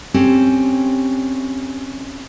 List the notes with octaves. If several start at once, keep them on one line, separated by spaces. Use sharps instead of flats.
C4 C#4 G4 A4